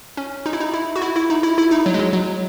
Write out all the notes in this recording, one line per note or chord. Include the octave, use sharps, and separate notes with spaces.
C#4
D#4
E4
D#4
E4
F#4
E4
E4
D#4
E4
E4
D#4
F#3
G#3
F#3
F#3